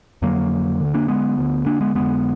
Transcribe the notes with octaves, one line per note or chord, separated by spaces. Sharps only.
F2 D3 F#3 A#3
D2 D3
A#3 D4
G#3 B3
D2 D3
A#3 D4
G#3 B3
F2 D3 G#3 B3